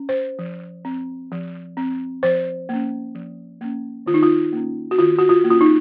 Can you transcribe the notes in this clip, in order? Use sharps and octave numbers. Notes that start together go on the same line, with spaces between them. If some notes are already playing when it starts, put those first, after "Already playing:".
Already playing: C#4
C5
F3
C4
F3
C4
F3 C5
A#3 C#4
F3
A#3 C#4
D#3 F4
D#4
F4
A#3 C#4
F#4
D#3 F4
F#4
F4
A#3
C#4 F4
D#4